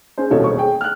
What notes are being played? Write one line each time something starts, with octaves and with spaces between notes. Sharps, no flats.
C#4 G#4 C5
D#1 C2 B2 C#4 A4 C#5
E1 C5 C#6
G#4 G5
F6 F#6